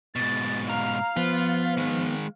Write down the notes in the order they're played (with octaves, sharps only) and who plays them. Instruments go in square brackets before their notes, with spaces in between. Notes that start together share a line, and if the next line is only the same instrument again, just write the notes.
[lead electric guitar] G#2 B2 [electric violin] A6
[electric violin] F5 [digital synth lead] A#5
[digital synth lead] F3 [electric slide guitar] B3 [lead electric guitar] F4
[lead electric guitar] D#3 G#3